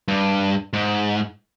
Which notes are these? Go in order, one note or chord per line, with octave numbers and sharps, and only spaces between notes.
G2
G#2